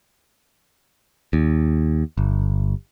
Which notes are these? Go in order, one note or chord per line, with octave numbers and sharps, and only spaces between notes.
D#2
G1